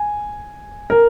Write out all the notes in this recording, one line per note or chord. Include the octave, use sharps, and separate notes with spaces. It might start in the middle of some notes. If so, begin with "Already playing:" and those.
Already playing: G#5
A#4